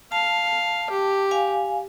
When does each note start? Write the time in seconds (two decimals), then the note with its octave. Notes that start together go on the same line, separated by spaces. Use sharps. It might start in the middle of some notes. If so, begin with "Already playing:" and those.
0.12 F5 A5
0.90 G4
1.31 F5 G#5